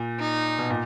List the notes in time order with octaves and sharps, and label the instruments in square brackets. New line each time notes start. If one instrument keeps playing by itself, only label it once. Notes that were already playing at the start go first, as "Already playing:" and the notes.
Already playing: [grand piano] A#2
[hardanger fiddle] D#4
[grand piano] B2
A#2